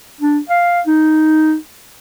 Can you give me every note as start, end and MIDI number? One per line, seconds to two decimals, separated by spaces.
0.21 0.39 62
0.49 0.81 77
0.86 1.55 63